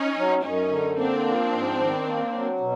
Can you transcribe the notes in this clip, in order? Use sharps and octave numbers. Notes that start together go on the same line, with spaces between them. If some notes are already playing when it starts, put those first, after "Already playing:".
Already playing: C#4 D#4
F#3
F#2 C#4 D#4
D3
A#3 C4 D4
F3
G#2
D#3
A#3
F#3
B2